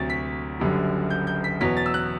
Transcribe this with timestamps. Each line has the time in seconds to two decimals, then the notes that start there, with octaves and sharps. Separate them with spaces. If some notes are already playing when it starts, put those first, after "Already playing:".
Already playing: D2 C3 F#3 A6
0.10 B6
0.60 F#1 F#2 D3 G3
1.10 G6
1.27 G6
1.44 B6
1.61 E2 B2 F#3 B6
1.77 A6
1.86 E6
1.94 F#6